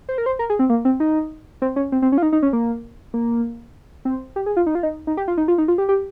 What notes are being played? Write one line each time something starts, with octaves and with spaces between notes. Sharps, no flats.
C5
A#4
C5
A#4
G#4
C4
A#3
C4
D#4
C4
C#4
C4
C4
C#4
F4
D#4
D#4
C#4
A#3
A#3
C4
G4
G#4
F4
D#4
F4
D#4
D#4
G4
F4
D#4
F4
D#4
F4
G4
G4